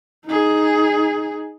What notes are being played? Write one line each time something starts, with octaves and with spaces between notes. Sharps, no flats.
D#4 G#4